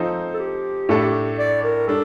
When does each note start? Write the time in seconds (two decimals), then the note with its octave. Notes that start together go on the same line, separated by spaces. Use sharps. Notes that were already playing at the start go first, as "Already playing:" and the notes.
Already playing: F3 C4 D#4 A4 C5
0.34 A4
0.39 G4
0.89 A2 A3 D4 A4
1.39 D5
1.63 A#4
1.87 G3 D4 A4